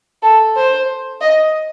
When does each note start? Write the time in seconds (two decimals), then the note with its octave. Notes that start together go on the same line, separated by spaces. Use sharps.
0.23 A4
0.56 C5
1.21 D#5